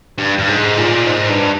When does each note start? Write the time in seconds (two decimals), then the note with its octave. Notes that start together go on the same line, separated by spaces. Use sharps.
0.18 G2
0.38 G2
0.48 G#2
0.77 A#2
1.06 G#2
1.29 G2